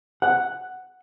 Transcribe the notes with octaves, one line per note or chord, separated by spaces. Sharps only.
F#5